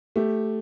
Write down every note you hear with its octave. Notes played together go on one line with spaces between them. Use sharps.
A3 G4